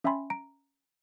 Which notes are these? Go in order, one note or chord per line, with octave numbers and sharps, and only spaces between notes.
C#4 E5 G5 G#5 B5 C6
A#5 D7